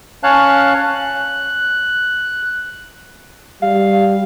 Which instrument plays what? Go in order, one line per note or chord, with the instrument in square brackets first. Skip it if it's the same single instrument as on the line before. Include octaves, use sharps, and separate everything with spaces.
[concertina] C#4 C#5 F5 A5 F#6
F#6
[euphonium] G3 [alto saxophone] F5